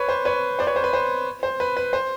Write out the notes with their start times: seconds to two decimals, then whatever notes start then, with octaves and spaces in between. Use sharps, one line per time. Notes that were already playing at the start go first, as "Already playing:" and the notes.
Already playing: B4 C#5
0.09 C5
0.25 B4 C#5
0.59 C5 D5
0.67 B4 C#5
0.76 C5
0.84 B4
0.93 C5
1.43 C5
1.60 B4
1.77 B4
1.93 C5